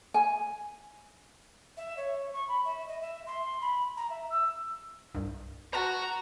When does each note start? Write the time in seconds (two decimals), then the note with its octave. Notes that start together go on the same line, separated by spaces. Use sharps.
0.14 G#5
1.77 E5
1.97 C#5
2.34 C#6
2.48 B5
2.65 E5
2.88 D#5
3.01 E5
3.27 C6
3.61 B5
3.97 A#5
4.10 E5
4.30 E6
5.14 C2 G2
5.73 F#4 B4 A5 A#5 A6